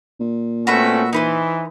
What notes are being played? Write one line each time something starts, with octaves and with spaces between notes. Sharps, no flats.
A#2
A3 C4 C#4 F#4 B4 E5
E3 D#4 B4 C5